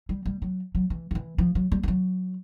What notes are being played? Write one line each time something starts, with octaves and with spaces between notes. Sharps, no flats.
G3
G3
F#3
F#3
E3
F3
E3
F3
F#3
G3
F3
F#3